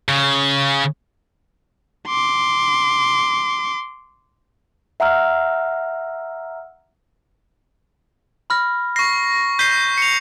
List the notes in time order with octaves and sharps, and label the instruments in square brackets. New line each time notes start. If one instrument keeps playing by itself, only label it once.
[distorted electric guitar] C#3
[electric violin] C6 D6
[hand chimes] E5 F#5 A#5 E6 F6
[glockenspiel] B5 F6 A#6
[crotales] C#6 A#6 [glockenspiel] C7
[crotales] G6 C7 [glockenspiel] B6 D#7 G7
[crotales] C#7 F7